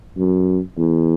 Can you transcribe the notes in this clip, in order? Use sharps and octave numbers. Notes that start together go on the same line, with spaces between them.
F#2
E2